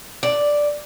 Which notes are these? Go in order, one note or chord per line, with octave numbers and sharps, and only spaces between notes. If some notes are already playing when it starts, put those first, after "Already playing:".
D5